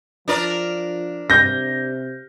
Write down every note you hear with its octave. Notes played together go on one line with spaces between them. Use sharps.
F3 D4 A#4 D5
C3 G6 A#6